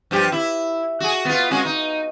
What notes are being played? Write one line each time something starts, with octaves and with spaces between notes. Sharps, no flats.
G2 F3 G4
E4
F#4 G#4
B3 F4
G#3 C#4 F#4
D#4